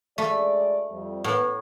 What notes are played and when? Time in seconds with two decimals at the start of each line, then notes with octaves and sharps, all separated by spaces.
0.18 D2 G#3 A3 D5
0.90 F2 G3
1.24 A2 B3